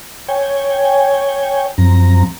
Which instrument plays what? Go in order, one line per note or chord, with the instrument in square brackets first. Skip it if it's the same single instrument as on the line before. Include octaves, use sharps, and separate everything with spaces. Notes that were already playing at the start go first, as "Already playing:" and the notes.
[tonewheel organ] C#5 G5 G#5
F#2 F3 C4 A#5